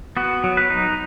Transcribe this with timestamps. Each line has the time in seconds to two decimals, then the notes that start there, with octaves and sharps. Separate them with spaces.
0.17 B3 F#4
0.44 F#3
0.57 B4
0.70 D#4